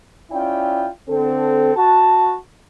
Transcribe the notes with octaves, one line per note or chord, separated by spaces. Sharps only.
C#4 E4 F4 D5 G5
D3 C4 A4
F#4 A5